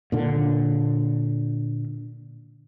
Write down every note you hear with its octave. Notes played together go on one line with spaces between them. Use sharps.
A#2 D3